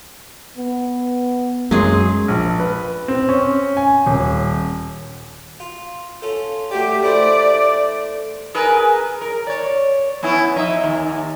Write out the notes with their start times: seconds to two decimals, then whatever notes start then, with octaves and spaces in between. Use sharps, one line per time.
0.57 B3
1.71 F#2 F#3 G#3 G#4 C6
2.28 A#1
2.60 B4
3.08 C4
3.29 C#4
3.77 G#5
4.06 D#1
5.60 F4
6.22 C#4 F4 A4
6.71 A3 F#4 G4 D5
7.03 A3 E4 C5 D5
8.54 G#4 A#4 B4
9.21 A#4
9.47 C#5 D5
10.23 B3 C#4 E4
10.56 F2 D#4 E5
10.84 D#2